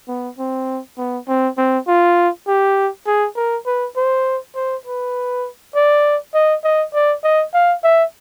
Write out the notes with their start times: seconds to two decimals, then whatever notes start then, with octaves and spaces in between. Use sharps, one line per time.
0.08 B3
0.39 C4
0.98 B3
1.28 C4
1.58 C4
1.88 F4
2.48 G4
3.07 G#4
3.36 A#4
3.66 B4
3.96 C5
4.55 C5
4.86 B4
5.75 D5
6.34 D#5
6.64 D#5
6.94 D5
7.24 D#5
7.54 F5
7.84 E5